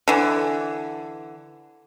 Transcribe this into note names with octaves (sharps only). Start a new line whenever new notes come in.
D3 E3